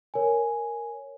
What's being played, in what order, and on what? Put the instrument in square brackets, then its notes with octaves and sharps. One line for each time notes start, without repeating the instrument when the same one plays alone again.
[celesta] A#4 C#5 G#5